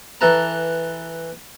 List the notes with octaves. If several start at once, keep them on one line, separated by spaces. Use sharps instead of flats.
E3 A4 B4 A5 A#5